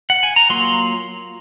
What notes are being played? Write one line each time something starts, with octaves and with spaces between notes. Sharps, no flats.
F#5
G#5
A#5
F#3 A#3 F4 C6